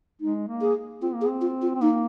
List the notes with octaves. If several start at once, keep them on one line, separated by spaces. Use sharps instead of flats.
G#3 D#4
A#3
G#4
C4 F4
A#3
G#4
C4
F4
F4
C4
A#3 D#4